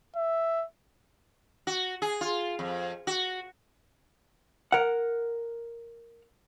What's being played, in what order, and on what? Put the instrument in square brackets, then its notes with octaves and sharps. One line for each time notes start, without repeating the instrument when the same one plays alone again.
[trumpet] E5
[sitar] F#4
G#4
F4
F2
F#4
[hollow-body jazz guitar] A#4 F#5